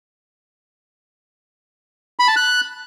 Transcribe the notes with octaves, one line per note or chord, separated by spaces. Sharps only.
B5
A5
F#6